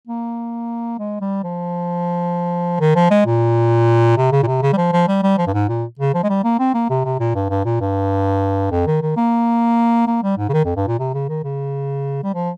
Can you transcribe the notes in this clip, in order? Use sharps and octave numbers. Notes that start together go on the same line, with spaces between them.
A#3
G#3
G3
F3
D#3
F3
G#3
A#2
C3
C#3
A#2
C3
C#3
G3
F3
F3
G3
G3
F3
G2
G#2
A#2
C#3
F3
G#3
G3
A#3
C4
A#3
C3
C3
A#2
G2
G2
A#2
G2
F2
D#3
D#3
A#3
A#3
G3
G#2
C#3
D#3
F2
G2
A#2
C3
C#3
D#3
C#3
G3
F3